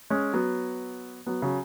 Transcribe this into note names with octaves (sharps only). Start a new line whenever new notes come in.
G#3 C#4
F#3 B3
F#3 B3
C#3 F#3